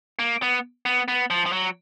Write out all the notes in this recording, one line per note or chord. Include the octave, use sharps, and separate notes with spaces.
A#3
B3
B3
B3
F3
F3
F#3